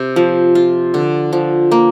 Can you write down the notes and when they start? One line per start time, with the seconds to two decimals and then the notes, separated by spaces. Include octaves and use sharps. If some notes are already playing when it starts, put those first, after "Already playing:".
Already playing: C3
0.16 F3
0.55 F4
0.94 D3
1.33 F3
1.71 A#3